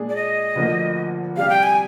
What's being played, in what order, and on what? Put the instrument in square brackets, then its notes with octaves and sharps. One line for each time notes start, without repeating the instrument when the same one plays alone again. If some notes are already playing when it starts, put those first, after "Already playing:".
Already playing: [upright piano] A#2 G#3 D4 G#4
[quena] D5
D#5
[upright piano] D2 D3 F3 A#3
[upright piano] C3 G3 D4 G4 [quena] F5
[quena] G5
G#5